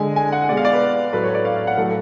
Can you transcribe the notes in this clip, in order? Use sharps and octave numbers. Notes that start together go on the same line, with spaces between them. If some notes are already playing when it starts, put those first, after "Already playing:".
Already playing: D3 G#3 G#5
G#5
F#5
B2 G#3 D5
F5
D5
B4
A2 F#3 A3 B4
C#5
D5
F5
F5
F#5
A2 F#3 A3 A4